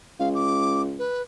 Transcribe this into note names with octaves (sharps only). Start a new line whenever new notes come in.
C#2 F5
D6
B4